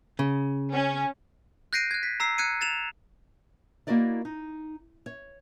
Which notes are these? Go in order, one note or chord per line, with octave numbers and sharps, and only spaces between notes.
C#3
C#4
F#6 G6 A#6 C7 D7 D#7
F#6 G#6
B6
A#5 E6 C7
F#6 G#6 C#7 D#7
A6 E7 F7
A#3 E4 F#4 A#4 D5 D#5
D#4
C#5